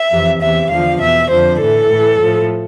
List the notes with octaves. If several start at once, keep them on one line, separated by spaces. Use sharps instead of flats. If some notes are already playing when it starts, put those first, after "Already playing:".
Already playing: E5
F2 C3 E3
E2 C3 E3 E5
E2 D3 F3 F5
E2 B2 E5
F2 D3 F3 C5
A2 E3 A4
A2 E3
A2 F3